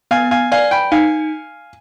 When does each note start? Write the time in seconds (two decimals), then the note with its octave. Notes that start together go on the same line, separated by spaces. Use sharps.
0.11 B3 F5 G#5
0.31 F5 G#5
0.52 D5 F5 G#5
0.71 G5 B5
0.92 D#4 F5 G#5